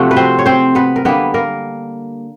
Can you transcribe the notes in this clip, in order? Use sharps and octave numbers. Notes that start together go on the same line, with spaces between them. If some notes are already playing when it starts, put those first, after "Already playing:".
Already playing: C3 F3 A3 F#4
B4
C4 C5
C#5
C4 C5
B3 B4
A#4
D3 G3 A#3 B3 B4
A#3 A#4